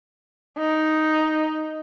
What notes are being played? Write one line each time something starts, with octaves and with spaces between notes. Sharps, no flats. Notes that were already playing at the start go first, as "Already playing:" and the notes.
D#4